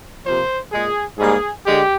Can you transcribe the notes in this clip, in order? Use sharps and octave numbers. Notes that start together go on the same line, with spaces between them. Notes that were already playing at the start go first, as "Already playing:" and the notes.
C3 F3 A#3 C5
A#2 G#3 G#4
G#2 G3 A#3 G#4
D3 G#3 G4